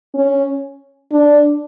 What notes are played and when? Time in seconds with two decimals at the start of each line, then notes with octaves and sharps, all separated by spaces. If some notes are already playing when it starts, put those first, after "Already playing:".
0.15 C#4
1.12 D4